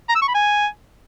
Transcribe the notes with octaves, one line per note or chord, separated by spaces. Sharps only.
A#5
E6
C#6
B5
G#5